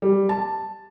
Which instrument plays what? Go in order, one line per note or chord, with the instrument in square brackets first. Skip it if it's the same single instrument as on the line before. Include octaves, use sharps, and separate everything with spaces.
[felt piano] G3
A5